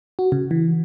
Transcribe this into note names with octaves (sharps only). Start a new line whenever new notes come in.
F#4
C#3
E3